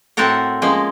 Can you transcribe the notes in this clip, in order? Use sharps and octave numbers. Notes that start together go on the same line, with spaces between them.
A2 C4 F#4 A4 A#4 F#5
F3 G#3 A#3 C#4